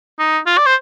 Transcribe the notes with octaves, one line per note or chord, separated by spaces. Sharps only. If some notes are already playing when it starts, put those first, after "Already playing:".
D#4
F4
D5
C5